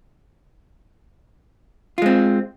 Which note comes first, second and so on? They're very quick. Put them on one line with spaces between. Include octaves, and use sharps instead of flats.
F4 G#3 C4